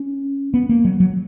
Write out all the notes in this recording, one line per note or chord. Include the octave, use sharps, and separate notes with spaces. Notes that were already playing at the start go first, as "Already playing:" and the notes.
Already playing: C#4
B3
A#3
F#3
F#3